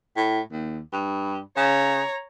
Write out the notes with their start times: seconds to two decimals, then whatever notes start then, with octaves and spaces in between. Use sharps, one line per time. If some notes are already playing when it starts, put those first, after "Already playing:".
0.17 A2
0.52 D#2
0.93 G2
1.57 C#3 C#5 A#5